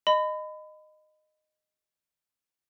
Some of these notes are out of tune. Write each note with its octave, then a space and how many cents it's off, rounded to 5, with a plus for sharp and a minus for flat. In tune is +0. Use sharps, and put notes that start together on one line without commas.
D#5 -15 B5 +30